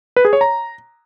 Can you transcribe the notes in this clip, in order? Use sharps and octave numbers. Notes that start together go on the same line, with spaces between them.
B4
G#4
C#5
A#5